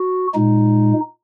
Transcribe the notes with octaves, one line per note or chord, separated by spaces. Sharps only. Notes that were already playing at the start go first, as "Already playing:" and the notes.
Already playing: F#4
A#2 G#3 D#4